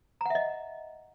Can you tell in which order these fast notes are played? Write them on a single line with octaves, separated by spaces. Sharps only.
A#5 F#5 E5 D#5